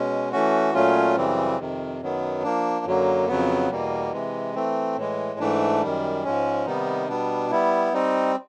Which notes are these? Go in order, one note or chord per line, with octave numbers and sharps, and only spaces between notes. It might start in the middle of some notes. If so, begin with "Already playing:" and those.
Already playing: B2 G#3 C#4
E3 A3 C#4 F#4
A#2 F#3 A3 C#4 F4
F#2 C#3 E3 G3 C4
F2 C3 D#3
F#2 D#3 F#3 B3
F3 A#3 D4
F#2 D3 F#3 A#3
F2 C#3 F#3 B3
E2 B2 G3 A#3
C3 E3 G#3
E3 A3 C4
A2 E3 G#3
G#2 E3 A3 D4
F#2 D#3 G3
G#2 F3 G#3 C#4
C3 D#3 G3 B3 D#4
B2 G3 B3 D4
G3 B3 E4
G3 C4 D#4